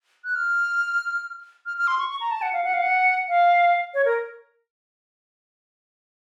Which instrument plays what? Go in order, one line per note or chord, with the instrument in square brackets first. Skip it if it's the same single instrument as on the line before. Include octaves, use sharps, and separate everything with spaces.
[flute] F#6
F6
F6
F6
C6
C#6
C#6
A#5
A5
F#5
F5
F#5
F5
F#5
F5
C#5
A#4